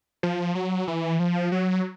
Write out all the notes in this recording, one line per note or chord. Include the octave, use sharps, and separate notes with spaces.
F3
F#3
E3
F3
F#3